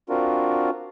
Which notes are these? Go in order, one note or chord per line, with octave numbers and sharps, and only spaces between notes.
C4 D4 F4 F#4 A#4